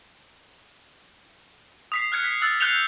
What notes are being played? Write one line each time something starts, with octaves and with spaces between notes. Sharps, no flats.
D#6 B6 C7
F6 F#6 G#6 C#7
B6
E6 F#6 A6
F#6 G6 C7 C#7 F7 G7